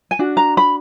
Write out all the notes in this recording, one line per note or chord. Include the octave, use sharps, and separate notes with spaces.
G#5
D4 F#4
A#5
B5